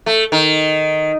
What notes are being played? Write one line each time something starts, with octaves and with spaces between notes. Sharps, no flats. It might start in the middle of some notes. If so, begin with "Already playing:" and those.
A3
D#3